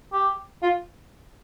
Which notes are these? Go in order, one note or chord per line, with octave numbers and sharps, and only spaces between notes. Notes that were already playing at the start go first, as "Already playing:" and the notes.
G4
F4